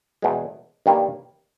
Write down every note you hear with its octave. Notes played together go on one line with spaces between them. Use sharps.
E2 B2 G#3
G2 D#3 G3 A#3